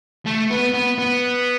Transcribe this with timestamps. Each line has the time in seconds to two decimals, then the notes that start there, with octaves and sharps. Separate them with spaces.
0.26 A3
0.50 B3
0.74 B3
0.98 B3